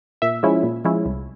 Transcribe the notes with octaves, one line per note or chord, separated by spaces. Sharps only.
A#2 E5
F3 G#3 C#4 E4
A#2
F3 G#3 C#4 E4
C2